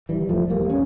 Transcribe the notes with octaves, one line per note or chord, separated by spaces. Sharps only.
E3 G3
E1 F3 A3
G3 A#3
C#4